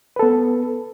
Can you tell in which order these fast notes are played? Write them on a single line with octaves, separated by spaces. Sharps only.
B4 A4 B3